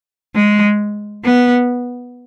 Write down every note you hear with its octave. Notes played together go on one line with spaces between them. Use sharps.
G#3
B3